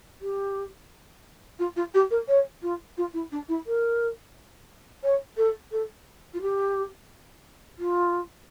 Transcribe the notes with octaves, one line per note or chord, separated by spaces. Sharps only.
G4
F4
F4
G4
A#4
C#5
F4
F4
E4
D4
E4
A#4
C#5
A4
A4
F4
G4
F4